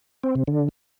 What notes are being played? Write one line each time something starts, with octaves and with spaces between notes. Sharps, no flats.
C4
C3
D3